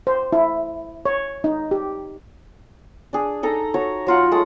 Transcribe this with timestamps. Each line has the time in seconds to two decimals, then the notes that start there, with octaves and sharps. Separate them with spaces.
0.07 C5
0.32 E4
1.06 C#5
1.44 D#4
1.71 G4
3.13 D4 G#4
3.43 D#4 A4 D#5 A#5
3.74 F#4 C#5 A#5
4.07 F#3 F4 F#5
4.31 G#3 A3 A5 D#6